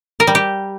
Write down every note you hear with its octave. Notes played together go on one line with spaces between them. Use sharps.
A#4
G3
G4